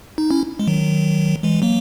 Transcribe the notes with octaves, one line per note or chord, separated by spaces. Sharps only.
D#4
C#4 E4
G#3
D#3 F#3
E3 G#3
F#3 A#3